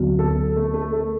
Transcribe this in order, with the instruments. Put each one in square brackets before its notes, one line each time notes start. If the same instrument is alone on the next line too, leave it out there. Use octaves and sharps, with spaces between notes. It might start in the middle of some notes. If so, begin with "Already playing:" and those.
Already playing: [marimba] D2 D3 F#3 B3 F#4
[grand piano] A4
A3
A3
A3